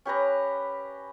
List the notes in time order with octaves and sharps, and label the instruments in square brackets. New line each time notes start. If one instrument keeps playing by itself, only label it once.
[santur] C#4 G4 B4 A#5